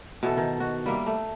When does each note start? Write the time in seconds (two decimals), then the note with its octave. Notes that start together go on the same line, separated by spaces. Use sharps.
0.23 B2 E3 A4
0.37 D#3
0.60 F#4
0.86 G3 A#3 E5
1.06 A3